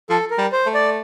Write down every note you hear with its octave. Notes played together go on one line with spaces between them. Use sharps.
F3 A4
A#4
G3
C5
A3
D5